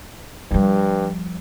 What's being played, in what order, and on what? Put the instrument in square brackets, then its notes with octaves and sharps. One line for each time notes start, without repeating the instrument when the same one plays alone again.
[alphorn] G2 [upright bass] F3 G3